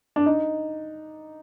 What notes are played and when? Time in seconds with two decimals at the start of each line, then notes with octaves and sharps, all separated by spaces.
0.16 D4
0.26 D#4